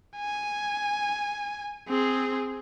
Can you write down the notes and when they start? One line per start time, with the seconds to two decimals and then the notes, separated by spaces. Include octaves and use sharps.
0.18 G#5
1.88 C4 G#4